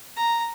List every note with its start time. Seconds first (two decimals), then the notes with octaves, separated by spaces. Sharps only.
0.16 A#5